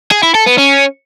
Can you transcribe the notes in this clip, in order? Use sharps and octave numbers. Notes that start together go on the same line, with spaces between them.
G#4
E4
A4
B3
C#4